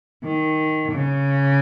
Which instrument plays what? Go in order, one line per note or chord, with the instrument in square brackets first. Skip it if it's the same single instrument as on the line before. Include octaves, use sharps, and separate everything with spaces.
[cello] D#3
C#3